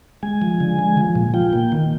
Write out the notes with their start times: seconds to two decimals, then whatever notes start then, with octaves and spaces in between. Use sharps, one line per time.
0.23 G#3 G#5
0.42 F3
0.60 D3
0.79 G#3
0.97 F3
1.16 A#2
1.34 F4 G5
1.53 A#3
1.72 D#3